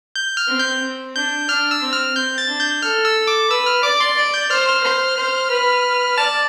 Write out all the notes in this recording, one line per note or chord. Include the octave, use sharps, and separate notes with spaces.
G6
F6
C4
G6
C4
D4 G6
D4 F6
E6
C4
F6
C4 G6
A6
D4
G6
A4 F6
E6
D6
B4 E6
F6
D5 D6
C6
D5
G6
C5 F6
F6
C5
C5
B4
D5 A5